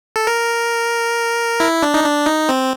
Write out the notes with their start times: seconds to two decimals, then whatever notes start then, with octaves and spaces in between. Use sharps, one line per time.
0.16 A4
0.27 A#4
1.60 E4
1.83 D4
1.94 D#4
2.04 D4
2.26 D#4
2.49 C4